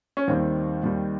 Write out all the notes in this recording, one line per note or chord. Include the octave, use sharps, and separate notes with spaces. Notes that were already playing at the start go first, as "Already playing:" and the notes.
C#4
D#2 D#3 G3 C4
D#2 D#3 G3